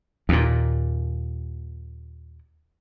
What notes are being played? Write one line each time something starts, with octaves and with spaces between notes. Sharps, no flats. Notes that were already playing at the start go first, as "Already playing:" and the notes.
D#2 A#2